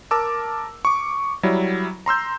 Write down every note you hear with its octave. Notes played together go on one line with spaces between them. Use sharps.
A#4 A5 D6 E6
C#6 D6
F#3 G3 E4
A#5 C6 E6 G6